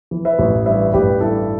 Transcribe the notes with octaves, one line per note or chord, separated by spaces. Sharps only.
E3
B4 E5
A1
G2 B4 E5
A1 G4 B4
G2 E4 A4